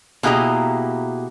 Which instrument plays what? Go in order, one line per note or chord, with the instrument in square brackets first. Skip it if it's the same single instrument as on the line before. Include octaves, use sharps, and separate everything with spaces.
[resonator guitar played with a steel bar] B2 A#3 E4 G4 G#4 A#5